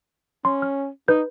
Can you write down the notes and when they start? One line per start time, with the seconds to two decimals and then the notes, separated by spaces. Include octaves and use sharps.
0.45 C#4 C6
0.62 F6
1.08 D#4 B4 G6